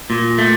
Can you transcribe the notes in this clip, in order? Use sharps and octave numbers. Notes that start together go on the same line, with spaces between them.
A#2
A3